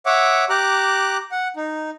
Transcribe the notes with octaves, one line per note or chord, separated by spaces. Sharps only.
C#5 E5 F#5 D6
G4 A#5 D6 F#6
F#5
D#4